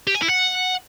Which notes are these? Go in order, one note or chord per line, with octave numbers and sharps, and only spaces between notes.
G4
G#5
E4
F#5